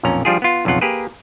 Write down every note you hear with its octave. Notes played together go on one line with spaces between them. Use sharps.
B1 F2 A#2 C#4 A#5
F3 G3 D4 F4 G4 G#4
B3 F4
B1 F2 C#3 F4 F#5
A#3 G4 G#4 B4